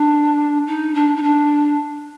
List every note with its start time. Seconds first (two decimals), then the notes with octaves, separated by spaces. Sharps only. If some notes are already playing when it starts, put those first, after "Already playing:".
Already playing: D4
0.67 D#4
0.94 D4
1.16 D#4
1.23 D4